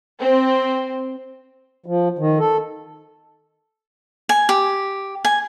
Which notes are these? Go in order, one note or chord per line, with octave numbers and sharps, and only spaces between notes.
C4
F3
D#3
A4
G#5
G4
G#5